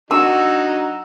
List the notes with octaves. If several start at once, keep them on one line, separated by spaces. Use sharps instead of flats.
F#3 D4 D#4 F#4 E6